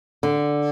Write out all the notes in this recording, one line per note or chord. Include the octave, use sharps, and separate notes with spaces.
D3